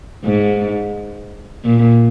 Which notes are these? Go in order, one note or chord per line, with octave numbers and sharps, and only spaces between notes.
G#2
A#2